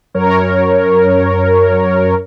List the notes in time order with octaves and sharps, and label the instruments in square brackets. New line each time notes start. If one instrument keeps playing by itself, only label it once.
[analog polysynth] F#2 A#4 C#5